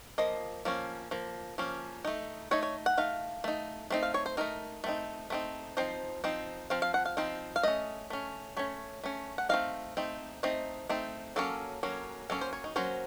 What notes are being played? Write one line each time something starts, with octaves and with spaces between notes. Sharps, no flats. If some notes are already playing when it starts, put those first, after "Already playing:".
F3 A#3 D#5
F3 A#3 C#4
F3 A#3
F3 A#3 C#4
A3 D#4
A3 D#4 C#5
C#5
F#5
A3 D#4 F5
A3 D#4
A3 C4 D#4
F5
C#5
C5
A3 C4 D#4 A#4
A3 C4 D#4
A3 C4 D#4
F3 C4 D#4 C5
F3 C4 D#4
F3 C4 F5
F5
F#5
F5
F3 C4 D#4
F5
A3 C#4 D#5
A3 C#4
A3 C#4 C#5
A3 C#4
F#5
A3 C4 D#4 F5
A3 C4 D#4
A3 C4 D#4 D#5
A3 C4 D#4
F#3 A#3 C#4 A4
F#3 A#3 C#4
F#3 A#3 C#4 A4
C5
C#5
D#4
F#3 A#3 C#4 C5